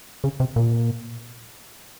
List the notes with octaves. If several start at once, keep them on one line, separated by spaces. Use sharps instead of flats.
C#3
C3
A#2